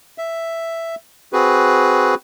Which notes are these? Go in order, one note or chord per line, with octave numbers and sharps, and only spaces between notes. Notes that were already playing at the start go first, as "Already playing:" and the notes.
E5
C4 F#4 G#4 B4